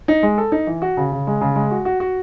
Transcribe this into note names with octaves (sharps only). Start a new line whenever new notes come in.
D#4
G#3
A4
D#4
E3
F#4
C#3
C#3
G#3
C#3
G#3
F#4
F#4
F#4